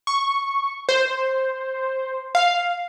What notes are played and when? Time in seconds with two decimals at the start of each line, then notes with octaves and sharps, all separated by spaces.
0.07 C#6
0.89 C5
2.35 F5